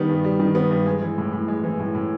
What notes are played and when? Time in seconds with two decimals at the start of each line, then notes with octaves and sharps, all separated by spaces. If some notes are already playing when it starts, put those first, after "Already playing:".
Already playing: D#3 G3 B3
0.09 G2
0.24 G3
0.40 D#3
0.55 B3
0.71 G2
0.86 G#3
1.02 E3
1.18 A2
1.32 A2
1.48 G#3
1.64 E3
1.79 A2
1.95 A2